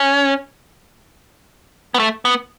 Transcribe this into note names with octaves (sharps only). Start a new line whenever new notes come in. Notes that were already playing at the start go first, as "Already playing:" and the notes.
Already playing: C#4
B3
A3
B3